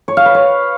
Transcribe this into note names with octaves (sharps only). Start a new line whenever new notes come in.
C#5
F5
B4
C#5